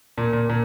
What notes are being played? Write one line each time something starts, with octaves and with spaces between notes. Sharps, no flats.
A#2
A#2
A#2